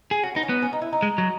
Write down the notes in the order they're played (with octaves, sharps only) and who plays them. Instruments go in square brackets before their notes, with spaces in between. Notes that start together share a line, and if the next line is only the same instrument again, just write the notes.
[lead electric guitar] G#4
[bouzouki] C#4 [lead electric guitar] F#4
[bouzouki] B3 [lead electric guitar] D#4
[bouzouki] C#4
[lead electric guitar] B3
[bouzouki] C#4
D#4
E4
D#4
[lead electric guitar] G#3
F#3